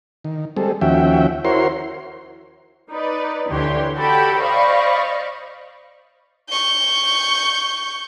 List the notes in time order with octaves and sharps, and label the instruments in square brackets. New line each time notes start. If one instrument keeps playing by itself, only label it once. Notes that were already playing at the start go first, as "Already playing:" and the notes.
[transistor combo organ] D#3
G3 G#3 C4 A4
D#2 F3 C#4 F#4 E5 G5
E4 F#4 A#4 C5 C#5 C6
[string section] D#4 B4 D5
D2 D3 E3 G4 C#5 C6
F#4 G4 A4 G5 A5 B5
C5 D5 D#5 F5 B5 C#6
[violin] C#6 G6